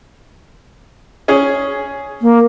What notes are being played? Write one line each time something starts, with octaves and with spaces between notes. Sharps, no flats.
C#4 G#4
A#3